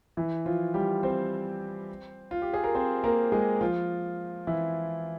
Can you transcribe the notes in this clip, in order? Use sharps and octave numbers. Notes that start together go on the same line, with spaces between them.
E3 E4
F3 F4
G3 G4
C4 C5
F4
G4
G#4
A#4
C4 C5
A#3 A#4
G#3 G#4
F3 F4
E3 E4